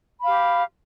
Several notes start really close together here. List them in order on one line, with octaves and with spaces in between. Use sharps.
B5 F5 G4